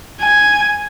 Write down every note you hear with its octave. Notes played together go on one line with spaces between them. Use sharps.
G#5